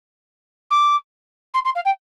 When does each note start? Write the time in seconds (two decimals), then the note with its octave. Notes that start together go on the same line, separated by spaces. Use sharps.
0.71 D6
1.54 C6
1.65 C6
1.75 F5
1.85 G5